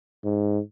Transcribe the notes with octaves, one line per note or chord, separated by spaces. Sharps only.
G#2